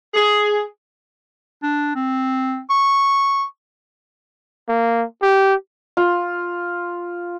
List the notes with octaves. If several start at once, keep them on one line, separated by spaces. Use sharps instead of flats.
G#4
D4
C4
C#6
A#3
G4
F4